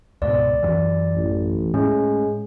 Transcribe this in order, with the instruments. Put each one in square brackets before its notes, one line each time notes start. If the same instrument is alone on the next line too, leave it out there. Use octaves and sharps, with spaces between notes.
[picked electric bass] C#2 G#2 B2 [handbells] D5
[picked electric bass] F#2 E3
[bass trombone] A1
[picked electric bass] A2 [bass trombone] G#3 [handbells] C#4